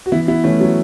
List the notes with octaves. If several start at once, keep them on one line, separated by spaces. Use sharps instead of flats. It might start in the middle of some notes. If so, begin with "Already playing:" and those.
F#4
E3 B3 E4
B3 E4
E3 A3 C#4
F#3 B3